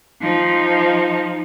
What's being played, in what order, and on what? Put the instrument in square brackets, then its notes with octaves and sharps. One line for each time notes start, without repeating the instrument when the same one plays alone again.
[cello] F3 D#4